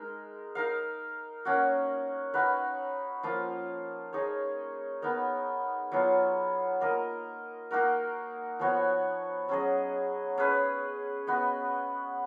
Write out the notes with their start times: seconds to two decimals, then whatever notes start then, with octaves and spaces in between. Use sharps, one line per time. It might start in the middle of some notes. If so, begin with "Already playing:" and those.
Already playing: G#3 D#4 A#4
0.55 D#4 A#4 F5
1.45 A#3 C#4 F#4
2.34 D#4 F#4 B4 F5
3.23 F3 A#3 F4
4.13 D#4 G#4 C#5
5.02 B3 D#4 A#4
5.92 F#3 B3 F4
6.81 A#3 F4 A#4 D#5
7.71 A#3 D#4 F#4 A#4
8.59 F3 B3 F#4 C#5
9.49 F#3 C#4 G#4 D#5
10.38 C#4 G#4 B4
11.27 B3 F#4 B4 D#5